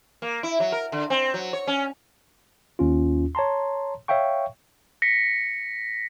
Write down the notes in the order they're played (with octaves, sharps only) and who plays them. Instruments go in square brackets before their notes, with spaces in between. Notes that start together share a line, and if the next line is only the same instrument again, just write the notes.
[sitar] A#3
E4
F#3
A#4
D3
C4
F#3
C#5
C#4
[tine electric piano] D#2 C#4 F4
C#5 A5 A#5 C6
C#5 E5 F5 G5 C#6
[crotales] A#6 B6 C#7